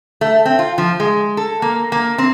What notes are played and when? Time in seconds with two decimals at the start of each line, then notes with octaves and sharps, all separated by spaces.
0.21 A3
0.45 C4
0.59 F4
0.78 F3
1.00 G#3
1.37 A4
1.62 A#3
1.92 A#3
2.18 C4